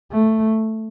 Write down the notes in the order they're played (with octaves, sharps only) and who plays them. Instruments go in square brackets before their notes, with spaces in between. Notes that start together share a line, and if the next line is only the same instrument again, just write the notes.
[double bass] A3